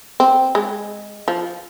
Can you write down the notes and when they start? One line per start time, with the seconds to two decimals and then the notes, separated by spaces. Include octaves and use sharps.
0.20 C4
0.55 G#3
1.28 F3